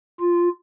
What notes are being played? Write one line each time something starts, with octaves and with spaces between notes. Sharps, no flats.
F4